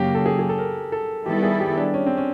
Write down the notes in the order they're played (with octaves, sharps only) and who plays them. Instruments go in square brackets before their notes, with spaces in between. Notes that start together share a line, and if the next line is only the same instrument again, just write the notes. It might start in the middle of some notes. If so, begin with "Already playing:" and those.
Already playing: [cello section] F#2 C#3 F#3 A#3 [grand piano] G4
[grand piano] A4
G#4
G#4
A4
A#4
A4
[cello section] D#3 G3 B3 E4 A4 [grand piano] G4
[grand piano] G#4
G4
D4
C#4
C4
C#4